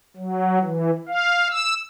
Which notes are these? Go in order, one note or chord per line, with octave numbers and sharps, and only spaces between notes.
F#3
E3
F5
E6